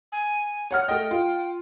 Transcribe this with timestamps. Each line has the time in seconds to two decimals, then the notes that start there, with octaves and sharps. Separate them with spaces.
0.12 G#5
0.71 C#5 F#5 F6
0.88 A3 D#5 G5
1.11 F4